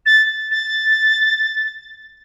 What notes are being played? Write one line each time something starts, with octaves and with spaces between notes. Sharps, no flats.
A6
A6